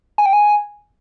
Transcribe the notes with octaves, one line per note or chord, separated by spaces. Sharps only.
G#5
G5
G#5